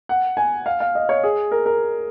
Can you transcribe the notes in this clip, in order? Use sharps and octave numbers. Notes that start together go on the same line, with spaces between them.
F#5
G#5
F5
F5
D#5
C#5
G#4
A#4
A#4